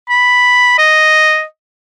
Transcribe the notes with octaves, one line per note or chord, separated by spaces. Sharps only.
B5
D#5